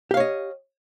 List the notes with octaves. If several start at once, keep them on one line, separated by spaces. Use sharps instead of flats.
G4 C#5 D#5 F5